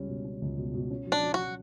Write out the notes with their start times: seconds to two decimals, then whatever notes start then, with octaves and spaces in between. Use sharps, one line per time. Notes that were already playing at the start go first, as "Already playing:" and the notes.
Already playing: C#2 G3 C#4
0.08 B2
0.25 C#4
0.42 C#2
0.58 B2
0.74 B2
0.91 C#4
1.07 F#3
1.12 D4
1.23 F#3
1.34 F#4
1.39 F#3